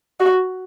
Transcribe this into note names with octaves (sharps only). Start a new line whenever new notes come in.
F#4